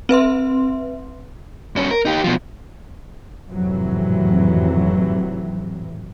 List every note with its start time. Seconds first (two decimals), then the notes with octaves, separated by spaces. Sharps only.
0.09 C4 B4 E5 C6
1.76 G2 C#4
1.91 A#4
2.05 D#4 G4
2.24 B2 F3
3.51 G#1 F2 A2 C3 E3 F#3